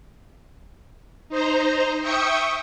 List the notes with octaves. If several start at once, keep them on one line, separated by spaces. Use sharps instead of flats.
D#4 C5 A#5
E5 G5 C#6 D#6 C#7